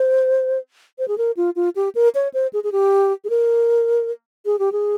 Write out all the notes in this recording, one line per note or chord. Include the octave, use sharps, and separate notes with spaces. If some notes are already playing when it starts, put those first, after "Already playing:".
Already playing: C5
C5
G#4
A#4
F4
F4
G4
A#4
C#5
C5
G#4
G#4
G4
G#4
A#4
G#4
G4
G#4